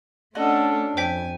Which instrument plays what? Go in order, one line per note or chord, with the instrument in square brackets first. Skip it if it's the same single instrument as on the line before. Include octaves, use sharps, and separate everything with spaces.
[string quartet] A3 D4 [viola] C#4 A4 [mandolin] F#4 D5 D#5
[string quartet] F2 [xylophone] C5 G5 B6 [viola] G#5